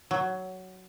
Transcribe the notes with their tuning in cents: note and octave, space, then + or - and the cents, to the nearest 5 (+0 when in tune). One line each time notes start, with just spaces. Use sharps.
F#3 +10